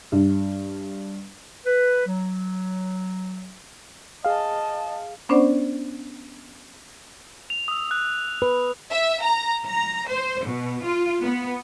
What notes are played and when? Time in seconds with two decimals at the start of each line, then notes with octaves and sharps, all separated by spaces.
0.12 G2
1.65 B4
2.06 F#3
4.24 G#4 D#5 F5 A5
5.29 B3 C#4 D4 C5 D5 F#5
7.50 F7
7.68 D#6 E6
7.91 F#6
8.42 B4
8.92 E5
9.24 A#5
9.67 A#5
10.10 C5
10.44 B2
10.85 F4
11.22 B3